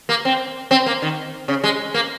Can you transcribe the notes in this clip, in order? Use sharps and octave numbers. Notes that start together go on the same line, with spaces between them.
A#3
C4
C4
A#3
D#3
C#3
G#3
A#3